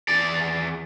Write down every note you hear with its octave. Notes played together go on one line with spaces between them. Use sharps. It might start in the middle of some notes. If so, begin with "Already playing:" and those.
E2 D5